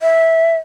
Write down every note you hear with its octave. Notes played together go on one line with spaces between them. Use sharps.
E5